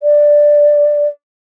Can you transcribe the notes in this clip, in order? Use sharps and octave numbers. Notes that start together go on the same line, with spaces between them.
D5